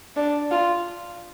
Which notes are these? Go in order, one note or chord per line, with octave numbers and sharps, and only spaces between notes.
D4
F4